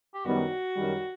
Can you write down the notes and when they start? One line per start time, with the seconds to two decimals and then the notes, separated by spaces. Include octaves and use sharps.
0.14 G4
0.25 F#2 D#3 G3 B3 F#4
0.76 F#2 D#3 G3